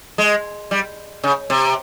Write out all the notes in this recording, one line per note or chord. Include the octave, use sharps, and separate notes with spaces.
G#3
G3
C#3
C3